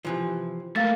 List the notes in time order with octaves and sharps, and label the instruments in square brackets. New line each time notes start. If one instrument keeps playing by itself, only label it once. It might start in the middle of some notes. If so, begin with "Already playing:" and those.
[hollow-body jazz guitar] C3 E3 F3
[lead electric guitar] A3 A#3 [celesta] F5 A6